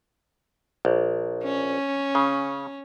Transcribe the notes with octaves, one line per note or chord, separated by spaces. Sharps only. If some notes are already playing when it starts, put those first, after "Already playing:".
A#1
C#4
C#3